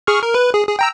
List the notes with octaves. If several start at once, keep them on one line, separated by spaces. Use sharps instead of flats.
G#4 C#6 F6
A#4
B4
G#4
G#4
G5 A#5 E6